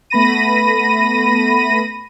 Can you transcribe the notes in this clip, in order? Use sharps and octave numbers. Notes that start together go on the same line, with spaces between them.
A3 B3 B5 A#6 D#7